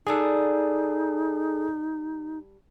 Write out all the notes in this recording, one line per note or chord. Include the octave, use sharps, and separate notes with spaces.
G3 D4 D#4 G#4 A4 F#5